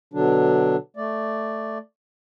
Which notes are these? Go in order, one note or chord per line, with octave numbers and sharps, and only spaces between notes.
B2 D3 F#3 D4
A3 D5